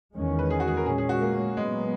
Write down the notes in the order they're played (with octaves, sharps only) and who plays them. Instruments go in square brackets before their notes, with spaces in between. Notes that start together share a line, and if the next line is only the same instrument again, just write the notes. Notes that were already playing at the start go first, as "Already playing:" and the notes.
[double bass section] E2 D#3 G#3 C#4
[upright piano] B4
G#4
F#4
G#4
A#4
[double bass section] A#2 G#3 C#4 [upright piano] G#4
[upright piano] G#4
F#4
A#3
[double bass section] A#2 F#3 B3 [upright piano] G#3